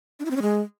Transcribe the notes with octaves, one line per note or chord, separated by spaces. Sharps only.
D4
E4
C4
C#4
G#3